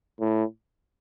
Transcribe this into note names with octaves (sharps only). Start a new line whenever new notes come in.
A2